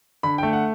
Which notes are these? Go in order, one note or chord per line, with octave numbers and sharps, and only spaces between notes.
D3 B5
A3 G5
F#5